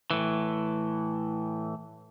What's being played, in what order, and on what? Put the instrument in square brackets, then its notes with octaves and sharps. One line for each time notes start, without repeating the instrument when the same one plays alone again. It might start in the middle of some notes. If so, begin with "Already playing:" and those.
[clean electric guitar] A2 E3